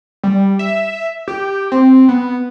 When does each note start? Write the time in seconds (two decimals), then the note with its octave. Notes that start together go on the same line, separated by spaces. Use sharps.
0.24 G3
0.59 E5
1.28 G4
1.72 C4
2.09 B3